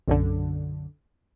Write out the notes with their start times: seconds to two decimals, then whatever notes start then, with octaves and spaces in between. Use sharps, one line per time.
0.08 B1 F#2 D3